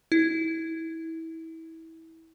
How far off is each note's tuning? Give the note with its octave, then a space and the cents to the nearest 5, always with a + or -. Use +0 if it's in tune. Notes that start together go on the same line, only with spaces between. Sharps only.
E4 -25